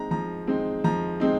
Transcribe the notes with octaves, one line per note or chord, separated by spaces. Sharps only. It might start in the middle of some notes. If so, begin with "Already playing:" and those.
Already playing: G#3 C4 D#4 A#5
F3 A#5
G#3 C4 D#4
F3 A#5
G#3 C4 D#4